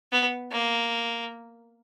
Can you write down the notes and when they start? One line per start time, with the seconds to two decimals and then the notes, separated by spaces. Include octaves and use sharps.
0.12 B3
0.52 A#3